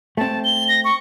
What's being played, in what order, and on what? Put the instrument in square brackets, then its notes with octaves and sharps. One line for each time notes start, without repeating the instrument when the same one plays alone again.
[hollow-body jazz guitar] A3 C4 [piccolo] A5
[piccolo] G7
A#6
C#6